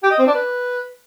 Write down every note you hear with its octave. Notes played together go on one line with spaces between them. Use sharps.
G4
D#5
C4
D4
B4